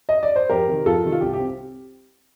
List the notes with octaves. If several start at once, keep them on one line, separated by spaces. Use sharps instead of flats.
D#5
D5
C5
F2 G4 A#4
C3 D#3
F2 F4 A4
C3 D#3
F4
C2 G4
G4
C4